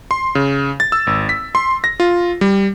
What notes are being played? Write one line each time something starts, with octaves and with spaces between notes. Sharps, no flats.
C6
C#3
A6
E6
G#1
B6
C6
A#6
F4
G3